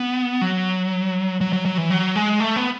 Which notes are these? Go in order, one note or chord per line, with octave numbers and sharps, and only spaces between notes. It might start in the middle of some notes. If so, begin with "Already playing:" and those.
Already playing: B3
F#3
F#3
F#3
F#3
E3
F#3
G#3
A3
B3